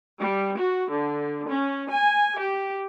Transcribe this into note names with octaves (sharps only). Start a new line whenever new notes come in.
G3
F#4
D3
C#4
G#5
G4